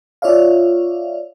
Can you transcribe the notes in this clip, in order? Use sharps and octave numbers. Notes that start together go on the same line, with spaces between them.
F4 C#5 D5 E5 F5